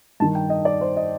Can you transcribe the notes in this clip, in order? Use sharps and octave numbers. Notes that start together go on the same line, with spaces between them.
G2 D#3 A5
G5
D#5
D5
C5
D#5